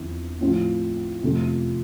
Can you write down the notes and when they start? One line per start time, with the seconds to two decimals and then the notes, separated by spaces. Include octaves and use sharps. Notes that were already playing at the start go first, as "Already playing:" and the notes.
Already playing: E2 D3 F3 C4 E4
0.41 A2 F3 C4
1.23 F2 C3 F3 A3